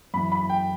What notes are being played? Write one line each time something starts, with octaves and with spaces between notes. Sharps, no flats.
F#2 E3 B5
B5
G5